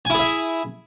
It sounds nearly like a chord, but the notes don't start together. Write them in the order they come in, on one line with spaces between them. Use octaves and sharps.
G#5 E4 G#4 E5